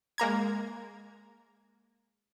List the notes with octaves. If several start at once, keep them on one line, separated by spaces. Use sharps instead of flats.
G#3 A#3 A#5 G#6